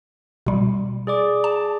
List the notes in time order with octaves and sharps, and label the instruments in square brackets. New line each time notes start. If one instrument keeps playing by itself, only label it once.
[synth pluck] B2 G3
[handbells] G#4 D5 D6
[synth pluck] A5